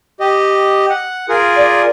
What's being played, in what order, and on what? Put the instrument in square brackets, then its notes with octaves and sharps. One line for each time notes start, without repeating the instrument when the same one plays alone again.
[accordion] G4 D#5
F#5
F4 G#4 A#4
[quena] D5